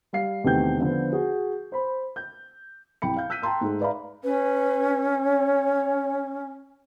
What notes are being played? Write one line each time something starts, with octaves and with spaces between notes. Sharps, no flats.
G3 F5 C7
E2 C3 D#3 A3 G5 G6
D3 F3 B3
F#4 G#4
C5 B5
G6
C2 G5 B5 C#7
F5 G6
E6 F#6 G6 B6 D#7
G5 A5 A#5 C6 E6
G#2 G#3 A3
B4 D5 E5 F5 A#5 B5
C#4 B4
C#5